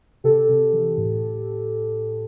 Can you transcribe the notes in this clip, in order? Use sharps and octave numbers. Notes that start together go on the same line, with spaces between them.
C3 G4 A4
C3
E3
A2